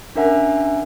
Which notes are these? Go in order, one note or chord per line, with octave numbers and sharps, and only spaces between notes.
C#4 D4 A#4 E5 F#5 G#5